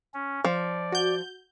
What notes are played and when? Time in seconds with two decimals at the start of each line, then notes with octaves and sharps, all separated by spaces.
0.14 C#4
0.45 F3 D5
0.92 F#4 G6